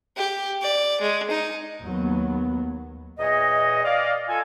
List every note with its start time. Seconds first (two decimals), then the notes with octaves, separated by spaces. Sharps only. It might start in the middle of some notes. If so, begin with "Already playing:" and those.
0.16 G4
0.62 D5
1.01 G#3
1.31 D#4
1.82 D#2 F#3 B3
3.20 E2 A#2 C#5 D#5
3.85 D5 D#5 F5
4.29 F4 A4 G#5